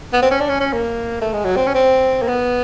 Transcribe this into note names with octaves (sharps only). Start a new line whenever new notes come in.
B3
C4
C#4
D4
C#4
C#4
A#3
A3
G#3
F#3
C4
C#4
C4
A#3
B3